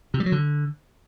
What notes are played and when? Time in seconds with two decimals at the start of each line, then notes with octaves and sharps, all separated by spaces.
0.14 C3
0.20 G3
0.26 F#3
0.32 D3